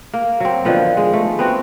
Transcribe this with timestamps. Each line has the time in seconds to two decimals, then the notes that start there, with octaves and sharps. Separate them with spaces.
0.13 A#3
0.40 F#3 C4
0.65 D3 D#3 F3 B3
0.97 G#3
1.13 A3
1.39 B3 C4 F#4